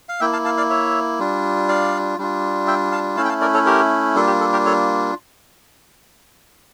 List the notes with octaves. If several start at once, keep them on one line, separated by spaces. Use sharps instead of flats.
F5
A#3 E4 E5 G5
F5 A5
F5 A5
D5 F5
C#5 E5
G3 D4 F4
D5 F5
G3 D4 F4
E5 G5
F5 A5
A3 C#4 E4 F5 A5
G5
F5 A5
A#4 D5
A4 C#5
G4 A#4
G3 A#3 D4 F4 A4
G4
A4
G4 A#4
A4 C#5